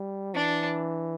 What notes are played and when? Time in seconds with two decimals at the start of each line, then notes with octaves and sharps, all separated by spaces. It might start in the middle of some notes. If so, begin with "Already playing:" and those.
Already playing: G3
0.34 E3 D4